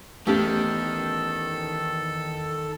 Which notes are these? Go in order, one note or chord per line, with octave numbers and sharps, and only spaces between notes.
E2 D#3 A3 C#4 G4 A4